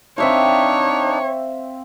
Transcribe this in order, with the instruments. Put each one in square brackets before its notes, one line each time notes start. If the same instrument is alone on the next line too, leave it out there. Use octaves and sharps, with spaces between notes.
[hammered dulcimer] C4 E5 F5 [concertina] D4 D#4 [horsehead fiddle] C#5